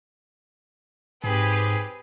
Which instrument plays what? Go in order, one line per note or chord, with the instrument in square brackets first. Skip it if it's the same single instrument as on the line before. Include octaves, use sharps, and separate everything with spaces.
[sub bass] G#2 [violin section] C4 G4 B4 [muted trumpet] G#4